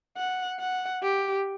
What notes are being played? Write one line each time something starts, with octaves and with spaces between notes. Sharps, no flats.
F#5
F#5
G4